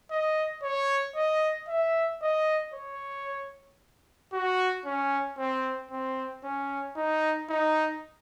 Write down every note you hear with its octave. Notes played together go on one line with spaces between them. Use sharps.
D#5
C#5
D#5
E5
D#5
C#5
F#4
C#4
C4
C4
C#4
D#4
D#4